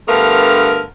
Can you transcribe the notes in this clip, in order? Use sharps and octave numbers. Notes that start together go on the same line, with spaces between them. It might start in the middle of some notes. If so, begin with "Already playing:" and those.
G2 D3 A3 B3 A#4 F5